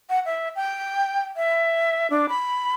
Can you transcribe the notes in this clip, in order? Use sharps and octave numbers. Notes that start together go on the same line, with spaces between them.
F#5
E5
G5
E5
D4
B5